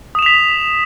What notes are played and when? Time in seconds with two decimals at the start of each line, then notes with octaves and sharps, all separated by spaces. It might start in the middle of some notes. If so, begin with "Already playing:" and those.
0.15 D#6
0.19 E7
0.22 F7
0.26 B6